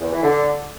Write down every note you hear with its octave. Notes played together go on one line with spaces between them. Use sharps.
E2
E3
D3